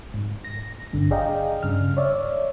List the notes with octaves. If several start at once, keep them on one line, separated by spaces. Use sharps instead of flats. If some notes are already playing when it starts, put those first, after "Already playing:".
G#2
A#6
G#1 G2 D3
G#4 D5 D#5 F5 G5 A#5
G2 C#3 F6
C#5 D5 E5